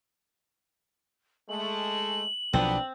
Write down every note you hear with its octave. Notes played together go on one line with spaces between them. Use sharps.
G#3 A3 F#7
B1 A#2 F3 B3 C4 D4